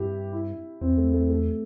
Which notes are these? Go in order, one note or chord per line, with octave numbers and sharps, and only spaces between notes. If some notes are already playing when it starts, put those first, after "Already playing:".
Already playing: G2 E4 G4
E4
E2 C4
A3
A3
A3